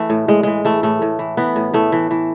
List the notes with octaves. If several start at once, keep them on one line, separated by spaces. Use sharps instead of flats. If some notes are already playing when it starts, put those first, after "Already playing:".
Already playing: E3 A3
A2
A2 G#3
E3 G#3
E3 A3
A2 A3
A2
E3
E3 B3
A2
A2 A3
E3
E3